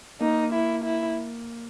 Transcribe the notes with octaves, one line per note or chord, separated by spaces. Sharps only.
A#3 D#4
E4
E4